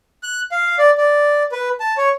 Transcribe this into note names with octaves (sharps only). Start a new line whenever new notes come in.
F#6
F5
D5
D5
B4
A5
C#5